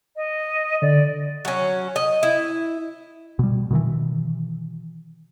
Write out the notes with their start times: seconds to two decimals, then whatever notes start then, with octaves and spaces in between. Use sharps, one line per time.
0.16 D#5
0.82 D3 D5
1.45 F#3 C#4
1.96 D#5
2.23 E4
3.39 B2 G3
3.71 B2 D#3 E3